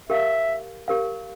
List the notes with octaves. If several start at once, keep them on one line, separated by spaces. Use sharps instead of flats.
G4 A#4 E5 F5
G4 A#4 F5